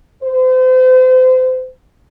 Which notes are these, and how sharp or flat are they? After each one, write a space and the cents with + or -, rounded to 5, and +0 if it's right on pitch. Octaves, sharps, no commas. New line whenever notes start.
C5 -35